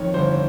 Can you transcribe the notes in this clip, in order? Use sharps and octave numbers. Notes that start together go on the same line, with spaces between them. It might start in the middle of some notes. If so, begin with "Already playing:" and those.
Already playing: F2 D#3 C#5
G1 C5